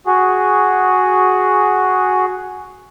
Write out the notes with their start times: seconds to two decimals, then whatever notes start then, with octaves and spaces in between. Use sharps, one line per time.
0.06 F#4 G#4